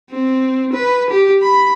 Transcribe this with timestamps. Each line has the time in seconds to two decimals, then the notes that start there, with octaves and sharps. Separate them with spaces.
0.10 C4
0.73 B4
1.10 G4
1.42 B5